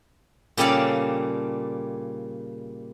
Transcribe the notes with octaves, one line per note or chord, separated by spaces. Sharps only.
A#2 C#3 G3 A4 D5 F5